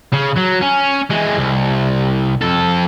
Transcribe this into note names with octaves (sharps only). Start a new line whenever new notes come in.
C#3
F#3
C#4
E3 G#3
C2
F2 A4